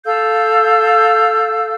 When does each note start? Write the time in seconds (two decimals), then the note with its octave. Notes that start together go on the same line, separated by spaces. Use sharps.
0.05 A4 F5 E6 G6